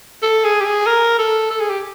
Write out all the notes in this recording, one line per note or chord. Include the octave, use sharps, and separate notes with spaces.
A4
G#4
G4
G#4
A#4
A4
A4
G#4
G4